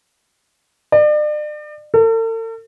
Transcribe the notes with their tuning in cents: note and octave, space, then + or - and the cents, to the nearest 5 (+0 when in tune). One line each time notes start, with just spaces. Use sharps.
D5 +40
A4 +45